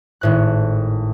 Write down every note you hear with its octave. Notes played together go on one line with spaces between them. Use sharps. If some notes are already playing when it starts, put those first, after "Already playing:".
G#1 A2 F#6